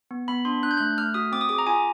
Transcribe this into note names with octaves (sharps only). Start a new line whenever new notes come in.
B3
B3 B5
D4 C6
D4 F#6
G6
A3 F#6
A3 F6
F#4 D#6
C4 D6
D#6
G#4 D6
A#5
F4 G#5